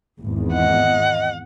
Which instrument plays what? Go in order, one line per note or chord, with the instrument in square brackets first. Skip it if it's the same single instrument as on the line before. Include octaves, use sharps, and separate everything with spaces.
[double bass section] G#1 E2
[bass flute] D#5 [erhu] F#5